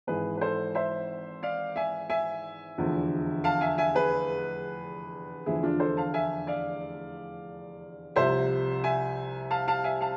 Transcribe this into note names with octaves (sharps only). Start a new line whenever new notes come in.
G#1 G#2 E3 G#4 B4
B4
A4 C5
C5 E5
D5 F5
E5 G#5
E5 G#5
F1 E2 D3 F3
F5 A5
E5 G#5
E5 G#5
G#4 B4
F1 E2 D3 F3 E4 G#4
D4 F4
A4 C5
F5 A5
E5 G#5
D5 F5
C2 C3 F3 C5 E5
E5 G#5
F5 A5
F5 A5
E5 G#5
F5 A5